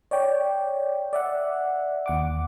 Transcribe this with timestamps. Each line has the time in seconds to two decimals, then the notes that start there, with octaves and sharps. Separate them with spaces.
0.11 C#5 D5 G5
1.13 D5 E5 F#5
2.06 D#2 F#5 D6